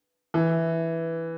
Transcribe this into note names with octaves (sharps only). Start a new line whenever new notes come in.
E3